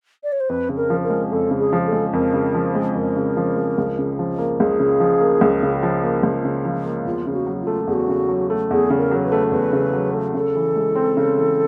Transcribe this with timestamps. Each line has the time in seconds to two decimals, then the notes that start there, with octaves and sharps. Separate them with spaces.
0.23 D5
0.32 C#5
0.40 C5
0.49 F2 B4
0.69 C#3
0.77 A#4
0.90 F3
1.04 A#4
1.10 G#3
1.31 F2 A4
1.51 C#3
1.58 G#4
1.73 F3
1.86 A4
1.92 G#3
2.13 F2 A#4
2.34 C#3
2.55 F3
2.75 G#3
2.95 F2 A#4
3.16 C#3
3.37 F3
3.56 G#3
3.78 C#2
3.99 C#3
4.19 F3
4.38 A#3
4.59 C#2 G#4
4.80 C#3
5.00 F3
5.21 A#3
5.41 C#2
5.63 C#3
5.83 F3
6.03 A#3
6.23 C#2
6.45 C#3
6.65 F3
6.86 A#3
7.05 E2 F4
7.27 C#3
7.33 F#4
7.47 F#3
7.61 F4
7.67 A3
7.87 E2 G#4
7.93 F#4
8.09 C#3
8.29 F#3
8.50 A3
8.70 E2 G#4
8.90 C#3
8.97 A#4
9.11 F#3
9.25 B4
9.32 A3
9.52 E2 B4
9.73 C#3
9.93 F#3
10.14 A3
10.34 C#3 A4
10.56 E3
10.76 G#3
10.95 C4
11.17 C#3
11.37 E3